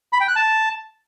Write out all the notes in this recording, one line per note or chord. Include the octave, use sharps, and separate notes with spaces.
B5
G5
F#6
A5